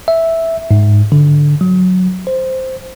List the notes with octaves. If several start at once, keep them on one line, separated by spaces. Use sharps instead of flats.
E5
G#2
D3
F#3
C5